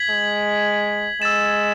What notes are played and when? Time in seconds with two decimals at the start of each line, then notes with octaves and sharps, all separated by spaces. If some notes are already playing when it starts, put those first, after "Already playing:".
Already playing: G#6 B6 F#7
0.10 G#3
1.21 G#3 E6 A6 E7